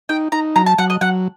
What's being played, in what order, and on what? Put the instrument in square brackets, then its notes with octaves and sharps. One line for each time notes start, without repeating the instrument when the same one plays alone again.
[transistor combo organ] D#4 [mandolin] G5
[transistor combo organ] D#4 [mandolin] A#5
[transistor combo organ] F#3 [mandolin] A#5
[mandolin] A5
[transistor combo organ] F#3 [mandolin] F#5
[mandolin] D#5
[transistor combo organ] F#3 [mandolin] F#5